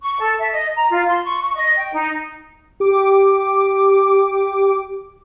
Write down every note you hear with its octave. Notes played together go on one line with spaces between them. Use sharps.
C#6
A4
E5
D#5
A#5
F4
C6
C#6
C#6
D#5
G5
D#4
G4 D6